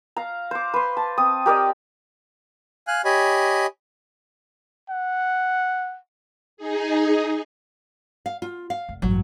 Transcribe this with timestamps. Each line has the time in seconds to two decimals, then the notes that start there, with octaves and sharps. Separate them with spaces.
0.16 F5 A#5
0.51 C5 D6
0.74 B4 C6
0.97 A5
1.18 C4 D#6
1.46 G4 A#4 D5 D#5
2.88 F5 G#5 F#6
3.05 G4 C#5 D#5 G#5 B5
4.90 F#5
6.57 D#4 G#4
8.26 F5
8.42 F4
8.70 F5
8.89 F1
9.02 A1 G2 F#3